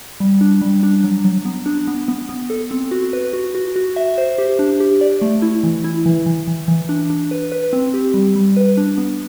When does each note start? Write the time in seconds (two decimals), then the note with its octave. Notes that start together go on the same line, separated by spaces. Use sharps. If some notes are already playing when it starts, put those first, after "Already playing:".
0.20 G3
0.41 D4
0.61 G3
0.83 D4
1.04 F#3
1.24 F#3
1.45 B3
1.66 D4
1.87 B3
2.08 B3
2.29 B3
2.50 A4
2.71 C4
2.91 F#4
3.13 B4
3.33 F#4
3.55 F#4
3.76 F#4
3.96 E5
4.18 C5
4.38 G4
4.59 D4
4.80 G4
5.01 D5
5.22 A3
5.42 E4
5.63 E3
5.84 E4
6.06 E3
6.26 E3
6.47 E3
6.68 E3
6.89 D4
7.10 D4
7.31 B4
7.52 B4
7.73 C4
7.94 G4
8.14 G3
8.36 G3
8.56 B4
8.77 D4
8.98 B3